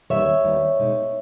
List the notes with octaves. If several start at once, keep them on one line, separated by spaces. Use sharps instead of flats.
D#2 D#3 G3 B3 C#5 E5
D#2 D#3 G3 B3
B2 G#3 D#4